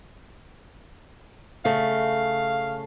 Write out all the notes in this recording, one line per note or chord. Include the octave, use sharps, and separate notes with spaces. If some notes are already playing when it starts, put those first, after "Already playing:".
C#3 A3 F5